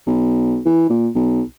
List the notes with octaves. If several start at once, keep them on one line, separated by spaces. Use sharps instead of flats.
B1
E3
A#2
B1